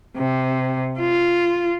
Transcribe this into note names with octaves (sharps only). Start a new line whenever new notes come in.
C3
F4